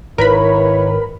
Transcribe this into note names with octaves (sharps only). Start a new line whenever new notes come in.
G#1 D#3 E4 A#4 B4 C#5 B5